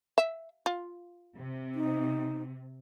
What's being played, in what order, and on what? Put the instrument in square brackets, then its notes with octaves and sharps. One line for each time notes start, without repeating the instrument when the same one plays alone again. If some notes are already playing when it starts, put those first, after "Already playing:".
[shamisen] E5
F4
[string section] C3
[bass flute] D#4